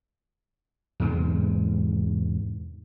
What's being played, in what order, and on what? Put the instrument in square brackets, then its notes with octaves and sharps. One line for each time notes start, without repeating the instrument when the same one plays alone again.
[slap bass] E2 G#2 C3 G#3